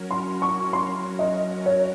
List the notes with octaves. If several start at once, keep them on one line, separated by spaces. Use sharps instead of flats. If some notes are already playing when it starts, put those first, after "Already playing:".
Already playing: F#3 C#4 F#4 A#4
C6
C#6
C6
D#5
C#5